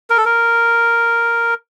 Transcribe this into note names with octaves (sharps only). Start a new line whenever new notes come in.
A#4
A4
A#4